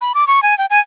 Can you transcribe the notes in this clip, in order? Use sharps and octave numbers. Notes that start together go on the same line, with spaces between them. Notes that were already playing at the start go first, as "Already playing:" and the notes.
B5
D6
C#6
G#5
G5
G#5